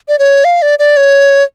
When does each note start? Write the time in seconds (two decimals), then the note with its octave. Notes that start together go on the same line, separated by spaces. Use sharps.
0.08 D5
0.19 C#5
0.45 F5
0.62 D5
0.79 D5
0.97 C#5